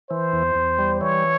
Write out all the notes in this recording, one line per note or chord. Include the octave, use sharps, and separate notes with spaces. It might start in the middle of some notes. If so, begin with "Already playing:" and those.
E3 C5
E2
E2
G3
E3 C#5